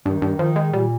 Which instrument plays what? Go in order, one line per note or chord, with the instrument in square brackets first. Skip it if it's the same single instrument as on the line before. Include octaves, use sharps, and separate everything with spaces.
[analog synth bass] G2 [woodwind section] D#3
[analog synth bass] G2
[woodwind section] D#3 [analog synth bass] F3
[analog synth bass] G#3
[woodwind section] A#2 [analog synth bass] G3